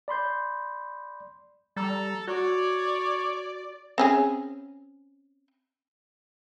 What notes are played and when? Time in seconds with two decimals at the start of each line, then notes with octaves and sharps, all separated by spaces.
0.08 D5 B5 C6 G6
1.76 G3 A4 A#5
2.27 F#4 C#5 D5
3.98 C4 C#4 G#4